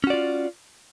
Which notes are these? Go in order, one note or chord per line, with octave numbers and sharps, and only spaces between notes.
C#4 F4 F#4 D5